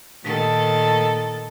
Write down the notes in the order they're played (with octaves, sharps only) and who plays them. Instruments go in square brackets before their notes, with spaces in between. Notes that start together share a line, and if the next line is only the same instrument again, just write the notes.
[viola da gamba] A#2 D#3 A4